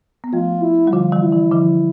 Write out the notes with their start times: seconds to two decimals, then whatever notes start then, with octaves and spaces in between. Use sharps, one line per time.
0.24 B3
0.33 F3 A3 F4
0.62 E4
0.87 G3
0.93 D3 F3 F4
1.12 E3 G3
1.22 E4
1.32 E3
1.52 D3 F3